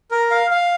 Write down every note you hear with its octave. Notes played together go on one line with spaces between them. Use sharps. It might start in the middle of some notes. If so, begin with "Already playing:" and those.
A#4
F5
F5